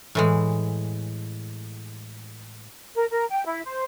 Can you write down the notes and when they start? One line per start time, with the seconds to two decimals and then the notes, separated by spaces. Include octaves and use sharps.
0.15 A2 E3 G#3
2.96 A#4
3.11 A#4
3.30 G5
3.46 E4
3.65 C5